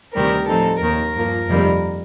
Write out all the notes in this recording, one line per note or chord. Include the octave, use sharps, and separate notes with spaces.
D2 C3 D#3 G3 A#4
A2 F3 C4 D#4 A4
D#2 D#3 A#3 A#4
G2 F3 A#3
F2 C3 D#3 G3 A#3